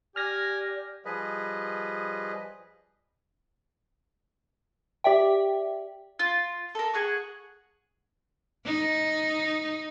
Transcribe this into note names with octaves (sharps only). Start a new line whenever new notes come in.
G4 D5 G#5 F6 A#6
F3 G3 G#4 B4 D#5
G4 D5 E5 G5
F4
A4 A#4
G#4 F#5 C#6
D#4